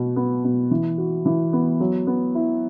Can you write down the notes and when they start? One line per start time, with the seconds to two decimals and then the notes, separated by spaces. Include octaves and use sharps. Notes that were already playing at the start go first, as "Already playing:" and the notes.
Already playing: B2 F#4
0.16 B3
0.44 B2
0.71 E3
0.98 F#4
1.26 E3
1.53 B3
1.80 F#3
2.07 B3
2.35 E4